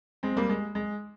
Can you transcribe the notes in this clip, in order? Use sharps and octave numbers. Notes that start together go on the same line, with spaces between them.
G#3 C4
G3 A#3
G#3
G#3